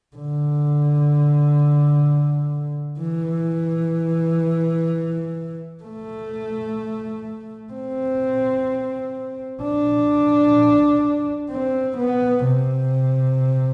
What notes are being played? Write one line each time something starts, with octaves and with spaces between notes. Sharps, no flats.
D3
E3
A3
C4
D4
C4
B3
C3